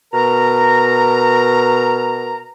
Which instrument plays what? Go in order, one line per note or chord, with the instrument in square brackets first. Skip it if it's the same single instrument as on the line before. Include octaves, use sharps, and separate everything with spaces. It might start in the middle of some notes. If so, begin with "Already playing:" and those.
[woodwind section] B2 A#4 A#5